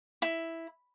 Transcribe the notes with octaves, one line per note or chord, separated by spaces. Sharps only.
E4